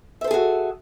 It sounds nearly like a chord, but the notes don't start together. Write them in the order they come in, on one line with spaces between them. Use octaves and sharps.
E5 C5 A4 G#4 F#4